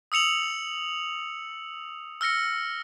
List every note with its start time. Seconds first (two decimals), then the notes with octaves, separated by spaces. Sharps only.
0.12 D#6 E6 C#7 F7 F#7
2.21 E6 F6 A#6 C#7